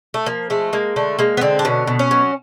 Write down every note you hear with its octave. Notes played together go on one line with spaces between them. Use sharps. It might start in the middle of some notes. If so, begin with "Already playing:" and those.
A3
F3 A#3
G#3 A3
G#3 A#3
D3 A3
G#3 A#3
B3
D3 C4
D4
B2 C#4
B2
C#4
F#3